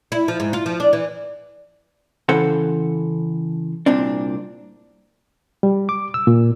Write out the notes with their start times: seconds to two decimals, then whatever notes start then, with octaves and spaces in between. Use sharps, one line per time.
0.12 E4
0.28 F3
0.40 G#2
0.53 F4
0.66 F3
0.80 D4
0.93 E3
2.29 C#3 E3 A4 C5 F#5
3.86 C2 A#2 C4 D4
5.63 G3
5.89 D6
6.14 E6
6.27 A#2